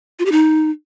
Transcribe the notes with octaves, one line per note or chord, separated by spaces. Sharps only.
F4
G4
D#4